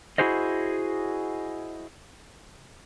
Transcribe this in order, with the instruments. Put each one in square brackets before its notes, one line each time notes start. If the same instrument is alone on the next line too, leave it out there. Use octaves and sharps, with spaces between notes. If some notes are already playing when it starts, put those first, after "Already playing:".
[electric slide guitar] E4 F#4 G#4 C5 D#5